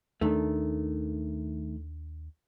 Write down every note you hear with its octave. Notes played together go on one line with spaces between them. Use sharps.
D#2 D#3 A3 D4